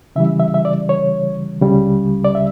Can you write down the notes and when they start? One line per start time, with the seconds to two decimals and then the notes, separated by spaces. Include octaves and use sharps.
0.16 C#3 E3 G3 E5
0.40 E5
0.54 E5
0.65 D5
0.89 C#5
1.61 C#2 C#3 G3
2.25 D5
2.35 E5